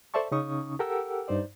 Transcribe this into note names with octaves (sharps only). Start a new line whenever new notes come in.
A4 C5 D5 E5 A5 C#6
C#3 C#4 D#4 C#6 D#6
G4 A4 A#4 F#5 G5 E6
G2 D#4 C5 D5